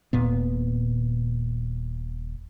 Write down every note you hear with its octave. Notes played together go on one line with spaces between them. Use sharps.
D#1 A#2 B3